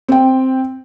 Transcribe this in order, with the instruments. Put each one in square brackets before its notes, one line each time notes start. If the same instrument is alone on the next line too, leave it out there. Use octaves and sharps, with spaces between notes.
[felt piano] C4 G5